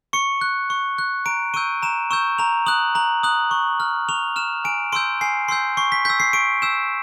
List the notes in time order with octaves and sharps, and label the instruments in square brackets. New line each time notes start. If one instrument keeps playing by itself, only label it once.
[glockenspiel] C#6 C#7
F#6
C#6
F#6
A#5 D7
C#6 E6 G6 D#7
A#5 E7
C#6 E6 G6 E7
A#5 F7
D#6 F#6 F#7
A#5 F#7
D#6 F#6 F#7
C#6
F6
C#6 F7
F6 E7
G#5 D7
C6 E6 G6 D7
G#5 C7
C6 E6 G6 C7
C#6 C7
B6
E6 G6 B6
C7
C#6 D7
E6 G6 E7